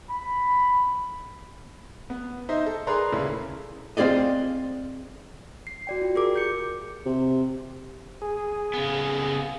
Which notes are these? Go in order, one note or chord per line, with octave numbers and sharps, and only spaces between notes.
B5
B3
D#4 C5 D#5 E5
A4
G#4 A#4 B4 D5 A#5 C6
D#1 C#3 E4 A4
C4 F4 G#4 D5 D#5
C7
F#4 D5 G5
F4
G4 G#4 A#4 D6
G6 C#7
C3
G#4
C#3 B3